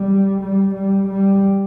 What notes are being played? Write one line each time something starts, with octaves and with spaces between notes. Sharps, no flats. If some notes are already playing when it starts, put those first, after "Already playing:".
Already playing: G3
G3
G3
G3